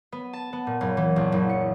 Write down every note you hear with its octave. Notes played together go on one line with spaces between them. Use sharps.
B3
A5
B3
A#2
F#1
E3
A#1
F#1
C#7